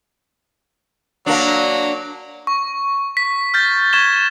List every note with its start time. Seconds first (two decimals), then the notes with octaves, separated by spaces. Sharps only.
1.26 F#3 A#3 D4
2.47 C#6
3.17 B6
3.54 F6 G6 A6
3.93 C#6 G#6 E7 G7